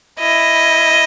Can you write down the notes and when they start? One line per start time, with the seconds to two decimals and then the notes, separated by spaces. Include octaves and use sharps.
0.19 E4 D#5